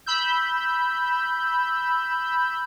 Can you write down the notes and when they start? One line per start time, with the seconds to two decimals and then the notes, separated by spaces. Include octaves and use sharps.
0.06 B5 E6 G6